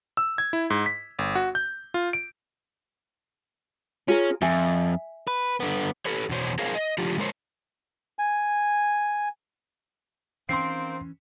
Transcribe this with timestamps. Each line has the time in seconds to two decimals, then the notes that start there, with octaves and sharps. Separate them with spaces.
0.17 E6
0.38 G#6
0.53 E4
0.70 G#2
0.86 B6
1.19 G1
1.35 F#4
1.55 G6
1.94 F4
2.13 D7
4.08 C#4 F4 G#4 A#4
4.42 F2 E5 G#5
5.27 B4
5.60 D3 B3
6.05 G4 A4 B4 C#5
6.29 E2 B2 C5 C#5
6.59 G#4 A#4 C5 C#5 F5
6.74 D#5
6.98 D3 F3 F4 G4
7.18 G#3 A#4 C5 C#5
8.19 G#5
10.49 D#3 E3 A#3 C4 C#4 C6 C7